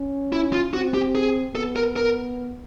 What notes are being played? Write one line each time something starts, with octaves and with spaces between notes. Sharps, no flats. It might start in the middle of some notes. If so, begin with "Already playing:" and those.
Already playing: C#4
E4
F4
C4 F#4
G4
G#4
B3 A4
A#4
A#4